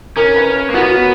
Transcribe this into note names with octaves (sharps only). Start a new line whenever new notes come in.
C#4 A#4
B4
A#3
B3 F#4